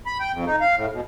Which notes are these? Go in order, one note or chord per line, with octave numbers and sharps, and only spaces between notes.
B5
G5
F2
D#4
F5
A2
B2